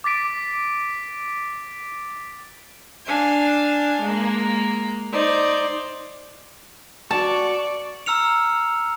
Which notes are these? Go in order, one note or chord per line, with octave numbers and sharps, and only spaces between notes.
D6 A6 B6 D7
D4 F5 G#5
G#3 A#3
D#4 C5 D5
F#4 D5 A5 C#6
A#5 E6 F6 C#7 F7